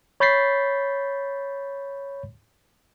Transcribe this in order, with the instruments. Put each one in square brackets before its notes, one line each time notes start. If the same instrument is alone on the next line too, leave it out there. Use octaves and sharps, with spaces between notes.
[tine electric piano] C#5 B5 G6 A6 B6 C7